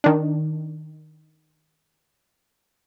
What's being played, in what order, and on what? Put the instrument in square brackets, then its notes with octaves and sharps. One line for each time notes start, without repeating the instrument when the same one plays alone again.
[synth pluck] D#3 D4